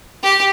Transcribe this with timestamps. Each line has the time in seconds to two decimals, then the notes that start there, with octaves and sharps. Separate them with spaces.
0.23 G4